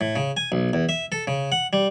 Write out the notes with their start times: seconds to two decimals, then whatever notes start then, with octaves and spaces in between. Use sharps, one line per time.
0.01 A2
0.16 C#3
0.37 G#5
0.52 B1
0.73 E2
0.89 E5
1.12 A4
1.27 C#3
1.52 F#5
1.73 G3